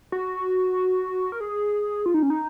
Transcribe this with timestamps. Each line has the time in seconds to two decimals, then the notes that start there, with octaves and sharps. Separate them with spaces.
0.12 F#4
1.32 A#4
1.41 G#4
2.06 F4
2.14 D#4
2.23 C#4
2.30 D#4